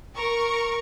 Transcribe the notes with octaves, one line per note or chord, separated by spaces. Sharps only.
A#4 C#6